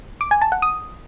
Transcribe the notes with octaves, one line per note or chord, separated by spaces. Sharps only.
D6
G#5
A5
F#5
D#6